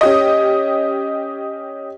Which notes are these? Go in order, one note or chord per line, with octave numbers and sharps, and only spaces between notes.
C#4 G4 D#5